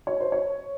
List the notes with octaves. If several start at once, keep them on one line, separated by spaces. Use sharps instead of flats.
C#5
C5
C#5